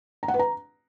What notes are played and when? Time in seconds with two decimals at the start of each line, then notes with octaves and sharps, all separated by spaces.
0.23 A#5
0.28 F#5
0.34 B4
0.39 A#5